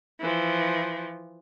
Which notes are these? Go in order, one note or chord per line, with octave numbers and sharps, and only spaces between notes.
E3 F3